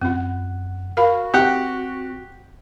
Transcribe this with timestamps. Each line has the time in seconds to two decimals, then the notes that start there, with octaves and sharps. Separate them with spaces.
0.01 F#2 C4 F4 F#5
0.97 F#4 A#4 F5 B5
1.34 C4 G4 F#5